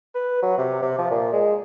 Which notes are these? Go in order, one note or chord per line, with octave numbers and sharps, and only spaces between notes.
B4
F#3
C3
C3
F3
A#2
G#3